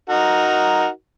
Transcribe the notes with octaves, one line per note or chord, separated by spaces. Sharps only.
D#4 F#4 A#4